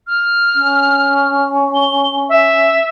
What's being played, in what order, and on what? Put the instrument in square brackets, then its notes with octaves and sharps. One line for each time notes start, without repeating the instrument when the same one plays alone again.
[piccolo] F6
[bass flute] C#4
[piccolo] G7
E5